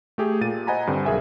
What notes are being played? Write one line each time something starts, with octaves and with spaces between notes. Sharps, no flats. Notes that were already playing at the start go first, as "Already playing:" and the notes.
A3 G4 G#4
A#2 A6 D#7
C5 D#5 F#5 G#5 A#5 B5
G2 D3 C4
B1 G#4 A#4 E5 G#5